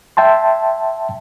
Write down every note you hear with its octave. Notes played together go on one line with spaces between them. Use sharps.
E5 G5 A5 C6